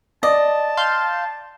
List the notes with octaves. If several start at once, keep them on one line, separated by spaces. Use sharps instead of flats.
D5 D#5 A5
F5 C6 G6